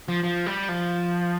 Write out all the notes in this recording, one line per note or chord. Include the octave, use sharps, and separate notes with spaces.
F3
F3
G3
F3